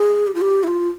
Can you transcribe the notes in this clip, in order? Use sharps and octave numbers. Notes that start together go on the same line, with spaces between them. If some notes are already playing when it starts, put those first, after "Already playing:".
Already playing: G#4
G4
F4
G4
E4
F4